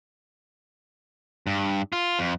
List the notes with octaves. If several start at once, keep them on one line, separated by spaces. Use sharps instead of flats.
G2
F4
F2